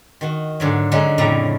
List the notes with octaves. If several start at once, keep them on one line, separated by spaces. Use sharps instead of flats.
D#3 F#4
G#2 D3 F#3
D3 F#3 G#3 C#4 D#4
F2 A2 C#3 A3 D5 A#5